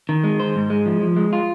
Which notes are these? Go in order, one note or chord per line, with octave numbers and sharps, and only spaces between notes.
D#3
G#3
C5
G#2
G#3
F3
F3
G#3
F4